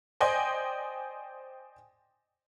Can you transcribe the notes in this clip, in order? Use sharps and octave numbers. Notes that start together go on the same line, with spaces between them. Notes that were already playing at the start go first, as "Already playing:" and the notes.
C5 D5 D#5 G5 G#5 C6